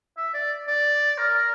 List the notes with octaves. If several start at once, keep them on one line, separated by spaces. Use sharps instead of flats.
E5
D5
D5
A#4